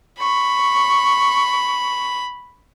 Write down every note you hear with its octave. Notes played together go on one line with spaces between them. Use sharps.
B5 C#6